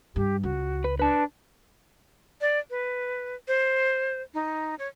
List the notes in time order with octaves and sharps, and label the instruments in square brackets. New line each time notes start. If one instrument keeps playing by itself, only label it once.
[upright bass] G2 [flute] G4
[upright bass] C#2 [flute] F#4
[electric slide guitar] B4
[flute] D4 [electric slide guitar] B4 A5
[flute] D5
B4
C5
D#4
C#5